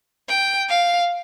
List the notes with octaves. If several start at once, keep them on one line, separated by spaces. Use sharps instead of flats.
G5
F5